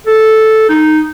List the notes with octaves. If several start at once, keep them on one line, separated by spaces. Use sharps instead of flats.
A4
D#4